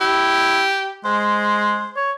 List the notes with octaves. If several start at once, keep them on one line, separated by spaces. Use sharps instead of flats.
E4 G4
G#3 C5
C#5